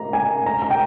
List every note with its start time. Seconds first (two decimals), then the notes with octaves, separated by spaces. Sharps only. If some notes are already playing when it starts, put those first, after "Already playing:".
Already playing: A#5
0.13 G#5
0.46 A#5
0.62 A#5
0.70 G5